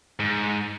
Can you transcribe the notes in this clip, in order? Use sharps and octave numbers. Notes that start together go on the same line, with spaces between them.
G#2